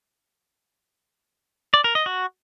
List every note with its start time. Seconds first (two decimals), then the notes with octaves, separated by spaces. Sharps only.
1.74 D5
1.84 A#4
1.95 D#5
2.06 F#4